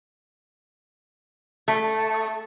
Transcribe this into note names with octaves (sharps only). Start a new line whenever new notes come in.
A3